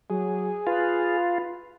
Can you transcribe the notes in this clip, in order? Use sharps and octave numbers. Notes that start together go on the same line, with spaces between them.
F#3 G#4
F4 B4